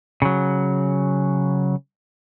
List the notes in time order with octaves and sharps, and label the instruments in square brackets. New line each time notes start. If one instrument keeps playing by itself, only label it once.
[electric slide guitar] C#3 F#3